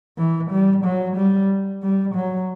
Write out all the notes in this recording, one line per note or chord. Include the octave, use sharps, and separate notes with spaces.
E3
G3
F#3
G3
G3
F#3